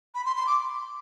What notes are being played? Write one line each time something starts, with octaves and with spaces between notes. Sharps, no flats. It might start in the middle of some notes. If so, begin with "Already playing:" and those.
B5
C6
C6
D6